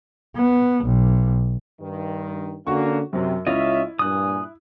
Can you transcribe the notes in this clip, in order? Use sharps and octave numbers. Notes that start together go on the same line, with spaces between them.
B3
B1
G2 D#3
D3 A#3 C#4 F#4 C#6
F#2 C3 F#3
C#2 C#4 E4 F4 D#5 E5
G2 A#2 G#5 D#6 F#6